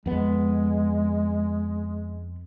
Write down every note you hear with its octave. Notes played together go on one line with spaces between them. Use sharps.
F2 G#3 B3